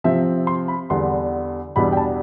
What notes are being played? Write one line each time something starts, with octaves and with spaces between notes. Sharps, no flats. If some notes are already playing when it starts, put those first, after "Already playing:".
C3 F3 C4 E5
C6
B5
E2 D3 G3 B3 D4 C6
E2 B2 G3 B3 D4 B5
G5
A5